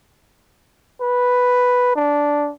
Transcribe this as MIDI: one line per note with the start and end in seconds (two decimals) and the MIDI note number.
1.01 1.94 71
1.96 2.51 62